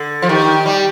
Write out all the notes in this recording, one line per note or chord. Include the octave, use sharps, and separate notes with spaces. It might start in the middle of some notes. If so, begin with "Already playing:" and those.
Already playing: D3
F3
D#3 G4
G3